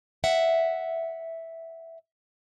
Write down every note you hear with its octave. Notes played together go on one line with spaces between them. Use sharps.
E5 F#5